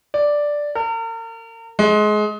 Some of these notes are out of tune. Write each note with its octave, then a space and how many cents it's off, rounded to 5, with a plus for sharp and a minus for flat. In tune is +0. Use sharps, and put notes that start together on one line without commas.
D5 +0
A#4 -40
G#3 +25